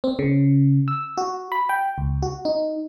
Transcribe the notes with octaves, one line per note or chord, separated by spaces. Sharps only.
C4
C#3
E6
F#4
B5
G5
C#2
F#4
D#4